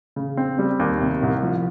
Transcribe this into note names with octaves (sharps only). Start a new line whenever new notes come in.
C#3
C4
G3
D#2
C3
C2
F3